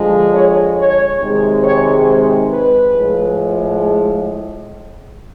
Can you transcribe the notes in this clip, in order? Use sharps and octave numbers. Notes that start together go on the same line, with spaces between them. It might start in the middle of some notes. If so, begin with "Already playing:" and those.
Already playing: D3 F3 G#3
C#5
C#5
C3 D#3 G#3
C#5
C5
B4
A2 F3 G#3